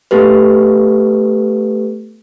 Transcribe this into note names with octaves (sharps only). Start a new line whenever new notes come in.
A3 B3 G4 A4 B4